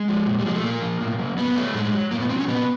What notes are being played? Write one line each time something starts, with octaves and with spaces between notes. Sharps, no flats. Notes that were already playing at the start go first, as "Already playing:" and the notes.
Already playing: G#3
F3
A#2
G3
F3 G#3
A3
A#2 A#3
F3
A2
F#3
A2 B3
F#3 A3
A2 G#3
F#3
A2 A#3
B3
F#3 C4
C#4
A#2 B3